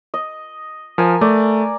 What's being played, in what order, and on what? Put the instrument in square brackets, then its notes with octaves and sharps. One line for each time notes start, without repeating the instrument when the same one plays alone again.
[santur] D#5
[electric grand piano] F3 [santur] A#4 G#5
[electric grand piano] A3 [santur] D5